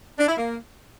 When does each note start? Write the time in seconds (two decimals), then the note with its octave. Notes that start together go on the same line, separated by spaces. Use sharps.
0.19 D4
0.28 E4
0.37 A#3